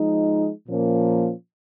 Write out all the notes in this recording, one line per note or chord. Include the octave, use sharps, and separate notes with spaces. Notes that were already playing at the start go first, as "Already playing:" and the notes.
Already playing: F3 G#3 D#4
A#2 F3 A#3 C#4